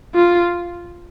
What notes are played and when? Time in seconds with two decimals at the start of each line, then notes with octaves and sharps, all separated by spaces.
0.14 F4